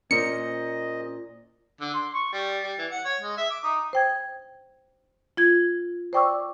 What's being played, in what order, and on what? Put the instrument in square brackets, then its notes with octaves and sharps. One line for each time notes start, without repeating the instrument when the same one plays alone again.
[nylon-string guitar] A#2 [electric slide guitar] C#4 A#4 C5 [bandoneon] D#5 [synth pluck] C#7
[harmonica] D3
C6
C#6
G3
G3
E3
F#5
C#5
G#3
E5
D6
D#4
[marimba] C5 G5 G#6
F4 G#6
C5 D5 G5 C#6 D6 E6